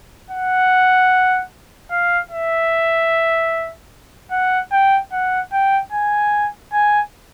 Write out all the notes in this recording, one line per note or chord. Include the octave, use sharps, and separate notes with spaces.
F#5
F5
E5
F#5
G5
F#5
G5
G#5
G#5